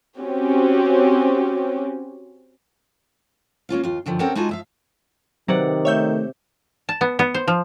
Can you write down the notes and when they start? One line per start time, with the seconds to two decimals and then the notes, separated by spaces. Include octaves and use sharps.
0.18 C4 C#4 F#4 G4 C#5
3.69 A#3 C#4 F4 F5
3.83 D#2 F4
4.06 F#2 D3 D#3 F3
4.19 C4 C#4 G4 A4 A#4 F#5
4.35 G#3 D#4 F4 F#4 G#5 A5
4.49 F3 E5 F5
5.48 C3 D#3 F#3 B4 D5 F#5
5.85 A3 C#5 E5 G6
6.89 A5
7.01 B3
7.19 B3
7.34 C5
7.48 F3